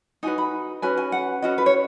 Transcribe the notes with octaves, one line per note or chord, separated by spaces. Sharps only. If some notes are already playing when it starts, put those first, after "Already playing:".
D#4 F#4 B4 G#5
B5
C#4 F#4 B4 G#5
G#5
F#5
C#4 F#4 B4 D#5
B4
C#5